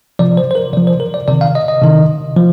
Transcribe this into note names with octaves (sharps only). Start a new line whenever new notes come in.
C3 F3 D5
C5
C5
A#4
C3 F3 D5
C5
A#4
D5
C3 D#3 D5
F5
D#5
D#5
C3 D#3
F3